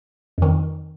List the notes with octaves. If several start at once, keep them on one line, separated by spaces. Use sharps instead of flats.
F2 D#3